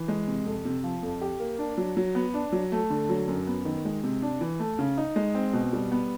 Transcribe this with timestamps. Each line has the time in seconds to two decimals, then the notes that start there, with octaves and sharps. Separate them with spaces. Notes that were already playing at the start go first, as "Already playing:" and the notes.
Already playing: E3
0.08 G#3
0.28 C3
0.46 F2
0.65 C3
0.84 F3
1.03 F2
1.21 G4
1.40 A#3
1.59 D4
1.78 F#3
1.97 F#3
2.15 B3
2.34 D4
2.52 F#3
2.72 A3
2.90 D3
3.09 F#3
3.28 F#2
3.47 B3
3.65 D#3
3.85 G#3
4.04 C3
4.22 D4
4.41 E3
4.59 A3
4.79 C#3
4.98 D#4
5.16 G#3
5.35 C4
5.53 B2
5.73 G3
5.92 B3